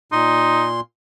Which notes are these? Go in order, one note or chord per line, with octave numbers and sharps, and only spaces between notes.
A#2 D#4 C6